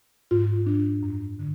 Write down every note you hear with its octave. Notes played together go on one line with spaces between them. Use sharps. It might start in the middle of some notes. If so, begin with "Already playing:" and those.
G#2 F4
D4
F#2
D3